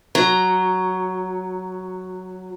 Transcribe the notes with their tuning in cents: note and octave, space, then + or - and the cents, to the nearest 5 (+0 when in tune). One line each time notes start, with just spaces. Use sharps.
F#3 +0 A#5 +0